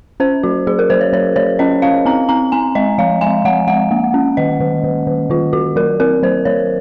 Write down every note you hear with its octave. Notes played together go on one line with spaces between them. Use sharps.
C#4 C5
F#3 F#4
F#3 G#4
A#4
F#3 C5
C#5
F#3 C#5
F#3 C#5
C#4 D#5
C#4 F5
C4 A#5
C4 A#5
C4 G#5
G#3 D#5
F3 F5
G#3 G#5
F3 F#5
G#3 F#5
A#3
C#4
D#3 D#5
D#3
D#3
D#3
D#3 F4
D#3 F#4
F#3 A#4
C4 A#4
F#3 C5
F#3 C#5